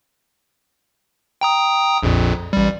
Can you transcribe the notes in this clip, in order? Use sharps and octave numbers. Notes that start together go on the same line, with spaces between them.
G5 A#5 D#6
A#1 F2 A#2
A1 G3